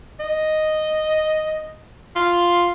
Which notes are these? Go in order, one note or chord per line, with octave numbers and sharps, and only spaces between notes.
D#5
F4